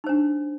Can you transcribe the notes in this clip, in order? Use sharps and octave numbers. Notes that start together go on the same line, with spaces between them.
D4 D#4 C5